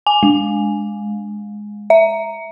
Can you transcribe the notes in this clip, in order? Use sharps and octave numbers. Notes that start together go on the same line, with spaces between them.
G#5
G#3
E5